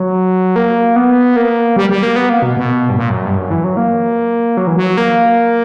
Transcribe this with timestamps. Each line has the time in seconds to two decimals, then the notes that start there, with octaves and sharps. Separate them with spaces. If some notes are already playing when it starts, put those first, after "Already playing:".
Already playing: F#3
0.56 A#3
0.96 B3
1.36 A#3
1.76 G3
1.89 G3
2.03 A#3
2.16 B3
2.30 A#3
2.42 B2
2.57 B2
2.89 G2
2.96 A#2
3.10 F#2
3.26 G2
3.37 F#2
3.51 E3
3.64 F#3
3.77 A#3
4.57 F#3
4.67 E3
4.77 F#3
4.97 A#3